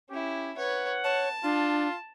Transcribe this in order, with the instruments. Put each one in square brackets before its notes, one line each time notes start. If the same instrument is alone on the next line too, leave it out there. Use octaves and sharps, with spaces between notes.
[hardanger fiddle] C#4 E4 [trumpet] G4
[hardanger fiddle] B4 C#5 [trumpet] F#5
[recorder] C#5 [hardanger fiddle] A5
[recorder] D4 [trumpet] F4